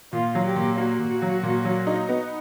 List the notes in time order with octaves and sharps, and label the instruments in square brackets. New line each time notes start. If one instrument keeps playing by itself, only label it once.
[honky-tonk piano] A#2 [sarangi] F4
[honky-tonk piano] F#3
[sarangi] G4
[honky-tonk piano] A#2
[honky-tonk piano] A#3 [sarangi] F#4
[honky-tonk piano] A#2
F#3
A#2
F#3
D#4
B3